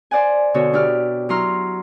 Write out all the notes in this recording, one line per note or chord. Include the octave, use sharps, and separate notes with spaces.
C5 D5 F#5 G#5
B2 D3 F#4 C#5
D4 E4 G4 D5 F6
F#3 E4 A#5 C6 F6